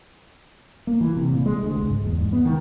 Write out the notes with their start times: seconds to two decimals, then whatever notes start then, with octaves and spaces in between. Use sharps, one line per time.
0.87 A#3
1.01 E3
1.16 C3
1.33 A#2
1.46 G#3
1.63 D2
1.76 C#2
1.89 G#2
2.06 E2
2.18 G#2
2.33 B3
2.45 D#3